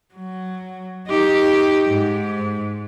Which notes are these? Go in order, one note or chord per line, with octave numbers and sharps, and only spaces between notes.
F#3
D#4 G4
G#2